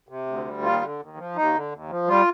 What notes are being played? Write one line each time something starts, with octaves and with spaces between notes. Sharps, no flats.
C3
D2
G3
D#2 F4
D3
D#2
F3
D#2 D#4
D3
D#2
F3
G3 F4